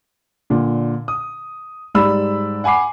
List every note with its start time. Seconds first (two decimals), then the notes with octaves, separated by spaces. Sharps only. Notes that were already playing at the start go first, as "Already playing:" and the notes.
0.50 A#2 D3
1.08 D#6
1.95 G#2 G3 D5 B5 E6
2.64 F#5 G#5 B5 D6 C7